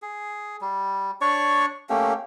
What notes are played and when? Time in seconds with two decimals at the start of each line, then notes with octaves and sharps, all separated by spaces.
0.02 G#4
0.61 G3
1.21 D4 C#5 D5 C#6
1.89 A3 A#3 C#4 G4